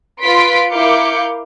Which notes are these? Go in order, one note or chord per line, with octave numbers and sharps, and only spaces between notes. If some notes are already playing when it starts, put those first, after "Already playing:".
F4 B4 C6 B6 D7
E4 A#4 F5 D6 G6 C#7